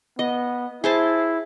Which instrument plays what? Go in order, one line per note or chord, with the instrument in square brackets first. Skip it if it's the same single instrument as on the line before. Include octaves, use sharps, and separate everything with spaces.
[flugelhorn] B3 [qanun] D#5
[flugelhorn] E4 [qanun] G#4 C5 A5